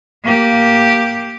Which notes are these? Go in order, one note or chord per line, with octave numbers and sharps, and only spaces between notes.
A#3 G4